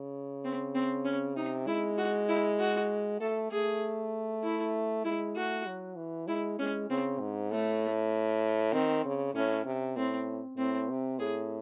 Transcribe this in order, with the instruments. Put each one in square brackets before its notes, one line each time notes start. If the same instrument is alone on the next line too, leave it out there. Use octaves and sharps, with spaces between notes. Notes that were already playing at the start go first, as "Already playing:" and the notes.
Already playing: [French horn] C#3
[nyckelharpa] C4
C4
C#4
[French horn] C3 [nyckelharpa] D#4
[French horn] G#3 [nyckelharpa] E4
[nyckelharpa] F#4
E4
F#4
[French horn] A3 [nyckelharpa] A4
[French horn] A3 [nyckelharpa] G#4
[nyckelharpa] E4
[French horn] G#3 [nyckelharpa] E4
[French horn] A3 [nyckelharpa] F#4
[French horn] F#3
E3
[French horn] G#3 [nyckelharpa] E4
[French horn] G#3 [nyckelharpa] C#4
[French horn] C#3 [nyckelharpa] C4
[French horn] G#2
[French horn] A2 [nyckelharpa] A3
[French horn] D#3 [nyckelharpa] C4
[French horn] C#3
[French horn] A2 [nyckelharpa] C#4
[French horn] C3
[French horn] A2 [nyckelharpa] C4
[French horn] A2 [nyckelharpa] C4
[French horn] C3
[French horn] A2 [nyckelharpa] G#4